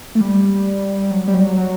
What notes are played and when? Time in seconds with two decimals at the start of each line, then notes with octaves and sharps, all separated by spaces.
0.15 A3
0.21 G3
1.11 F#3
1.28 G3
1.34 F#3
1.57 F#3